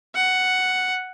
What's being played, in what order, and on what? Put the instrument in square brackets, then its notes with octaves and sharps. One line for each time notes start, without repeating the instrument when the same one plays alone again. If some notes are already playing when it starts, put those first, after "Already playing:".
[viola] F#5